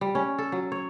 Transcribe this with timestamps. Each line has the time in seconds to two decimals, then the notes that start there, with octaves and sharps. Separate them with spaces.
0.01 G3
0.15 C#4
0.38 A4
0.52 F#3
0.72 C#5